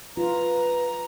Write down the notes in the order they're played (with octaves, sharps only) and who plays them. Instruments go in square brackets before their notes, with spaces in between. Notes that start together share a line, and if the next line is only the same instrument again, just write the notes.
[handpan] F4 [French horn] B4 [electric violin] A#5